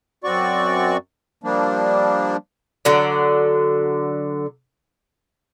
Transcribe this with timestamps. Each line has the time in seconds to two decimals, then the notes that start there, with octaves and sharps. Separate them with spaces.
0.24 F#2 C4 F#4 D5 C#6
1.44 F3 G3 A#3 D4
2.85 D3 F#3 D5